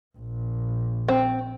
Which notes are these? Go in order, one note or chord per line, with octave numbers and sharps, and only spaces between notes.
A#1
C4